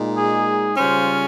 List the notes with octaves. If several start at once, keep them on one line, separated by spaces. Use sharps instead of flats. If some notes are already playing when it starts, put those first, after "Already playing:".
Already playing: A#2 G#3 D#4
G#4
C#3 G3 C#4 F4 C5